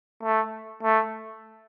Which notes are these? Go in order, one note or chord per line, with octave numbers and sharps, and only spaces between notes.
A3
A3